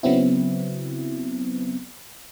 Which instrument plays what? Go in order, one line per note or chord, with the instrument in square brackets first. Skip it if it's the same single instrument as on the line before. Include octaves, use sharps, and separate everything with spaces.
[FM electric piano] C#3 F#3 B3 C4 E4